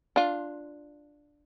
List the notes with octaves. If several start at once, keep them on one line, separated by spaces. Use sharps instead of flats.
D4 F4